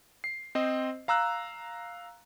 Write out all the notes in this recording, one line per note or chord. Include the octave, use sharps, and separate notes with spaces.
C7
C4 C5 D#5
F5 A#5 E6 F#6